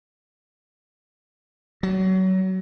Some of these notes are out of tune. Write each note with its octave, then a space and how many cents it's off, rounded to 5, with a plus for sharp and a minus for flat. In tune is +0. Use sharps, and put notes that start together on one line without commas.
F#3 +25